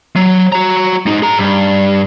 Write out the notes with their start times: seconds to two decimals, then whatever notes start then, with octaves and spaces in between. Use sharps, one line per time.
0.16 F#3
0.52 F#4 A#5
1.06 G#3 D#4
1.22 G#4 A#5
1.38 G2